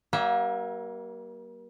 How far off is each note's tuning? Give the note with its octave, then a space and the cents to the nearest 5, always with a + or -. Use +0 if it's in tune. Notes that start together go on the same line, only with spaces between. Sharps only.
G3 -40 A#3 +30 E5 +0